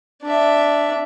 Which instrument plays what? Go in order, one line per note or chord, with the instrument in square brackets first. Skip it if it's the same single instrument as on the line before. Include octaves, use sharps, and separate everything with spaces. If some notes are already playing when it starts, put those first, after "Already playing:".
[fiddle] D4 E5